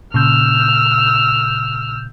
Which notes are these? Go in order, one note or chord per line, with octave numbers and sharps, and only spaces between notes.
A#2 C#3 E6 F6 G6